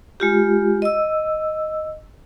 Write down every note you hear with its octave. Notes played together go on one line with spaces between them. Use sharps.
G#3 F4 G4
D#5 E6